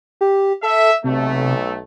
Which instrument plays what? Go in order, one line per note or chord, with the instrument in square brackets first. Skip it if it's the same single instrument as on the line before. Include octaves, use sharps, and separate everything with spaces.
[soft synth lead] G4
[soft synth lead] A4 [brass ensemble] E5
[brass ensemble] B1 A3 [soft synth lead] C3